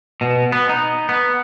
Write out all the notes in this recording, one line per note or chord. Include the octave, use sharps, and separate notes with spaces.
B2
B3
D#4
B3